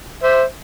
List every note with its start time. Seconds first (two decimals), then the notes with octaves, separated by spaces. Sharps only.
0.23 C5 E5